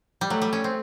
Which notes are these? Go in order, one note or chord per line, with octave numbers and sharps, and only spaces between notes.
G3
F#3 A3
G3
C#4
C4